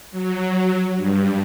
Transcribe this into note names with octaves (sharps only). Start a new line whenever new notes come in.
F#3
G2